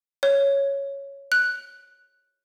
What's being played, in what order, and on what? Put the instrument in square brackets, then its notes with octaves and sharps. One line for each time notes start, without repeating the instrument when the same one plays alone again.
[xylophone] C#5
F#6